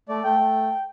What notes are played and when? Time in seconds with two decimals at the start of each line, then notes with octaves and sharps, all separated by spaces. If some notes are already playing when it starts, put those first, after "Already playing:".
0.09 A3 D5
0.24 A3 G5
0.39 A3